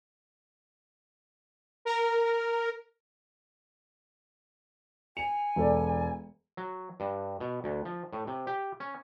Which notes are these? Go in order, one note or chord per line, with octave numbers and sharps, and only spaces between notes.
A#4
G#5 C#7 F7
E1 A4 D5
F#3
G2
B2
D2
F3
A2
C3
G4
C#4